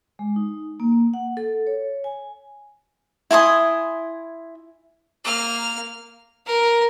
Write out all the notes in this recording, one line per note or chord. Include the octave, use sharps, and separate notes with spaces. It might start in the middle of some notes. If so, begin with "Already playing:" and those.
G#3
D#4
A#3
F#5
A4
C#5
G#5
E4 G#5 C6 D#6
A#3 F6
A#4